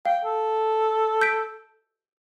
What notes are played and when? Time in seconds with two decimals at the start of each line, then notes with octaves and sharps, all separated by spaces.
0.05 F5 G5
0.25 A4
1.21 G6 B6 D7